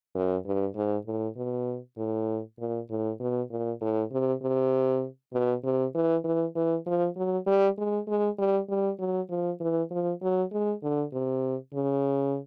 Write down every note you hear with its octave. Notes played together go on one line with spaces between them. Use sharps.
F#2
G2
G#2
A2
B2
A2
A#2
A2
B2
A#2
A2
C3
C3
B2
C3
E3
E3
E3
F3
F#3
G3
G#3
G#3
G3
G3
F#3
F3
E3
F3
F#3
G#3
D3
C3
C#3